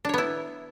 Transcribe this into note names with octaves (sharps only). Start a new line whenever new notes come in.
B3 D4 E4 C#5